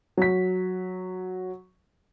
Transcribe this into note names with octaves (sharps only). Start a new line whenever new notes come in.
F#3 B6